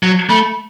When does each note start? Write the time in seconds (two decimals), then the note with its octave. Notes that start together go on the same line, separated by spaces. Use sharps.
0.03 F#3
0.30 A3 B5